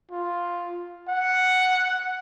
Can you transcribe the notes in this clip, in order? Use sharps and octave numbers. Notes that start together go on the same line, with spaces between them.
F4
F#5